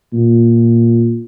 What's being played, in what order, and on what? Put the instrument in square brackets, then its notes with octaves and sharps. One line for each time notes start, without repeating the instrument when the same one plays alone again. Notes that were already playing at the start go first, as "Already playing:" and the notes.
[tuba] A#2